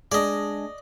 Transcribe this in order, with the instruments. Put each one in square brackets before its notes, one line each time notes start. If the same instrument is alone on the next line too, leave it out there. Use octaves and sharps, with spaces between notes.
[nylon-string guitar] G#3 D4 [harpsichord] D5 D#5